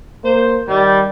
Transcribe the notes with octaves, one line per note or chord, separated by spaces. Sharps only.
A#3 C5
D#3 G3